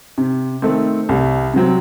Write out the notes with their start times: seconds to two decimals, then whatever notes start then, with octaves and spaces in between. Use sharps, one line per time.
0.18 C3
0.62 D#3 A3 C4
1.09 C2
1.54 C3 F#3 C4